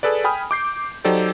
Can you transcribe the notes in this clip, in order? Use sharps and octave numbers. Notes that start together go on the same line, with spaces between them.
G#4 A4 B4 D5
G5 G#5 B5 D#6 F6
D6 G6 C7
F#3 D#4 G4 A4 C5 D5